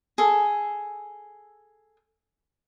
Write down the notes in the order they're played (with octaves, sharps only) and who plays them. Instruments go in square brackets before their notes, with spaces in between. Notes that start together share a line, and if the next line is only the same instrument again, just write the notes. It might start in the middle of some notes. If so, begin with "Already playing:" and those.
[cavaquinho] G#4 A4